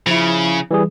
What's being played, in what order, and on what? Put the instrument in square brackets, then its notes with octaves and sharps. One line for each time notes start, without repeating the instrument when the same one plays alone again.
[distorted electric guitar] C#3 [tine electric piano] F3 E4
[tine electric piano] E3 G3 G#4